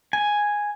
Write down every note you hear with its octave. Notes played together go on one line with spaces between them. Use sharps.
G#5